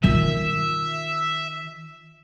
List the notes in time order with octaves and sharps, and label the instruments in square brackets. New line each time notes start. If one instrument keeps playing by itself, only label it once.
[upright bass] D#3 F4 [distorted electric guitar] E5